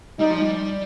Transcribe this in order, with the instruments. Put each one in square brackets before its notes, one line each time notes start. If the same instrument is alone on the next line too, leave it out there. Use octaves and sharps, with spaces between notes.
[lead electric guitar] G3 [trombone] D#4
[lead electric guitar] F3
G3